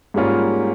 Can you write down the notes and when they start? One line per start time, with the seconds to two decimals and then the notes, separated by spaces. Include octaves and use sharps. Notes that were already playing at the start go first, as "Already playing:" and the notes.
0.14 G#2 G3 A#3 C#4 F4